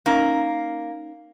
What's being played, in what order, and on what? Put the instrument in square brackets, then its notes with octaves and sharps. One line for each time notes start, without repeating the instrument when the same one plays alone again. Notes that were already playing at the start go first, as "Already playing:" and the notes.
[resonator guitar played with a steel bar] A#3 [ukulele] C#4 D#4 A#4